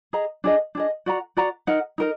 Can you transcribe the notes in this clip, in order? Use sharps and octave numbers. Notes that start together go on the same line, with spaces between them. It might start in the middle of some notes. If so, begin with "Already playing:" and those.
G#4 D#5 A#5
D4 G#4 D#5
D4 G#4 D#5
F#4 D5 F#5 A#5
F#4 D5 F#5 A#5
D#4 A#4 D#5 F#5
D#4 A#4 D#5